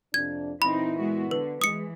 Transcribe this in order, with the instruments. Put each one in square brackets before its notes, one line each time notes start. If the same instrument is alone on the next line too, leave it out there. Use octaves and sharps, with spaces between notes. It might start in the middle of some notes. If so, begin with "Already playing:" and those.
[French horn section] F2 C3 D4 [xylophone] G#6
[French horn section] A#2 E3 E4 [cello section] C4 D#4 [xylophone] B5
[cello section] G#3 B3 F#4
[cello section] D3 [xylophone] B4
[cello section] E3 [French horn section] G#3 [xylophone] D#6 C#7